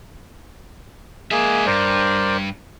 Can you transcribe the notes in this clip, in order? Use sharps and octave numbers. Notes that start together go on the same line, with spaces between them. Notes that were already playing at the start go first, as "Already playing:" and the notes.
G#3 A#3 G#4 E5
G2 A#4 C5 D5